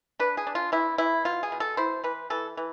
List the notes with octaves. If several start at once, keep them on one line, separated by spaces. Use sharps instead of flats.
D4 B4
G#4
D4
F4
E3 E4
E3 E4
B2 F4
G#4
B2
A4
E4 C5
E3 B4
E3 A4
E3